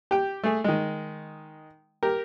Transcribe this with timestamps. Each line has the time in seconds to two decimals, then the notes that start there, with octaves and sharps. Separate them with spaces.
0.11 G4 G5
0.44 A3 G#4
0.64 D#3 G#3
2.03 G4 A#4